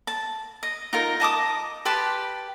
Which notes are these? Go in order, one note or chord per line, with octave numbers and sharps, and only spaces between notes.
A5
D#5
D#4 F4 A#4
D#5 A5 D6 D#6
G4 B4 A5 C6